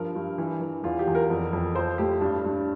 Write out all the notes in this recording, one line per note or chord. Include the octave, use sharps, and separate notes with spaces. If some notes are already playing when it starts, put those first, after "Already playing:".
Already playing: G2 F3 A#4
G2
E3
E3
E2 F4
G4
E2
A#4
F2
F2
F3 C5
A2 G4
G2 D4
G2